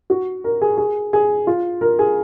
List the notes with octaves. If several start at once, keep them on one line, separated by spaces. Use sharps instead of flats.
F#4
A#4
G#4
G#4
G#4
F4
A#4
G#4